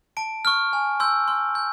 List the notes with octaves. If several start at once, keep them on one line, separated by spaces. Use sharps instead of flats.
A5 D7
C#6 F6
G#5
C6 E6 G6
C6
G6